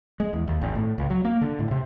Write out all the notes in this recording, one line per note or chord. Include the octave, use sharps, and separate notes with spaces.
G#3
E2
D#2
G#1
A2
C#2
F#3
A#3
D3
A2
C3